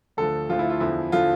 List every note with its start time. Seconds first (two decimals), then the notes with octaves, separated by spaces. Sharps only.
0.17 D2 D3 F3 A4
0.49 D2 D3 F3 F4
0.59 E4
0.70 F4
0.80 E2 D3 F3 E4
1.12 D3 F3 F4